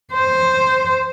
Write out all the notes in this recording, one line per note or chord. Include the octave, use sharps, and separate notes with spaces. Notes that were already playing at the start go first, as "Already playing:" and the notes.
C5